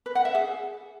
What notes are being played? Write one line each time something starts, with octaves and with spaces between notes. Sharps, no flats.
B4
F#5
E5
G#4